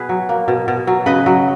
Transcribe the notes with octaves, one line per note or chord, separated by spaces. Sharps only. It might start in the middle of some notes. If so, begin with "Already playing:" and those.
Already playing: B2 G#4 B4
F#3
A#3
B2
B2
F#3
C#3 B4 D#5
F#3